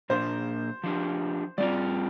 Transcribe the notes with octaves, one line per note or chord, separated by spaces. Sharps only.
A#2 A#3 D4 C5
F3 D4 G4
G3 C4 F4 D5